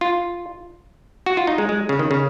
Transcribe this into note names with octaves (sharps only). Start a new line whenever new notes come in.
F4
F#4
F4
D#4
G#3
G#3
C#3
D#3
C#3